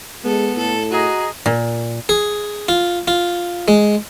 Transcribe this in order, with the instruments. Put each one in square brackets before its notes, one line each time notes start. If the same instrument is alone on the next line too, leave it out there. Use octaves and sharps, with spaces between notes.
[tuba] G#3 [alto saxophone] B3 [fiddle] A4
[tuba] A2 [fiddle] A4
[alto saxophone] F#4 [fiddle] G#4 [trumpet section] D#5 A#5
[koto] A#2
[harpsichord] G#4
F4
F4
G#3